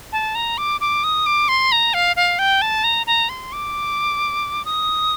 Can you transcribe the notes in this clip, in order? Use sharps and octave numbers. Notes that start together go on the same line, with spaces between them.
A5
A#5
D6
D6
D#6
D6
C6
A#5
F5
F5
G5
A5
A#5
A#5
C6
D6
D#6